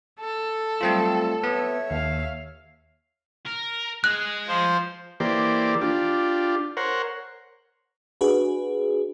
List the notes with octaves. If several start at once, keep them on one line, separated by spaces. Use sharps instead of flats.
A4
F#3 G3 A3 C4 F4
B3 C#5 E5
D#2 F5
A#4
G#3 G#4 F#6
F3 C5
E3 A#3 G4 C5 D5
D4 F4 G4
A#4 C5 C#5 F#5
D4 F#4 G#4 B4